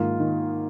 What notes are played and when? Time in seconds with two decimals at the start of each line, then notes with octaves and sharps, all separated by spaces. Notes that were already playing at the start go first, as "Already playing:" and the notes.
Already playing: G#2 D#3 A#3 F4
0.20 D#3